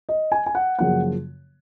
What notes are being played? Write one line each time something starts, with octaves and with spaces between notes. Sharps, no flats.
D#5
G#5
G#5
F#5
F#2 C#3 F3 A#3 F#5